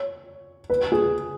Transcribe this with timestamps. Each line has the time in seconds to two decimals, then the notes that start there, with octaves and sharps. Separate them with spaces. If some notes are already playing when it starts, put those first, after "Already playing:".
Already playing: C#5
0.70 B4
0.92 G#4